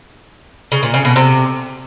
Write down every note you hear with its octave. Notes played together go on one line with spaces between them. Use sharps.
C#3
A#2
C#3
B2
C3